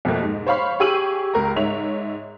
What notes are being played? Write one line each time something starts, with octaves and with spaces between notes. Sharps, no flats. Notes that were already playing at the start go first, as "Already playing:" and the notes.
F2 B2 F3 A3 A#3
G#2
C5 C#5 F5 B5 C#6
G4 G#4 C#6 E6 D#7 F#7
C#2 A#4 A#5
G#2 C#5 E5 F7